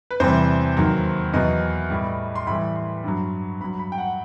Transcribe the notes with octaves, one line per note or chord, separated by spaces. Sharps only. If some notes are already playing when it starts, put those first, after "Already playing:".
B4
E2 C3 E3 G3 C5
D#2 D#3 F#3
E2 B2 F#3 D#5
A2 G3
C6
A2 E3 G3 B5
C6
G2 F#3
G2 F#3 B5
B5
G5
F#5